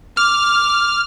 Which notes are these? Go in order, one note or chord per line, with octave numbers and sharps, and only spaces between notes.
D6 F6